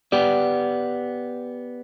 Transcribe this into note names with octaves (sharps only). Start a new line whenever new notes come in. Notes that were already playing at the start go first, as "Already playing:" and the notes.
B3 G4 D5